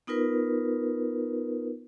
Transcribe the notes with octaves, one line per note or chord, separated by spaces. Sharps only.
B3 D#4 F4 A#4 B4